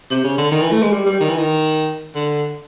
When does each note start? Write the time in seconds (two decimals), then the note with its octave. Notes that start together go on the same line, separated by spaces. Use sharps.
0.11 C3
0.24 C#3
0.38 D3
0.51 D#3
0.61 E3
0.72 A3
0.82 G#3
0.92 G3
1.06 G3
1.20 D#3
1.29 E3
1.38 D#3
2.15 D3